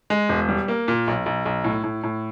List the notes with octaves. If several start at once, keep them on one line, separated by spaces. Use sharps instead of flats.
G#3
E1
G3
A#3
A#2
B1
B1
B1
A2
A2
A2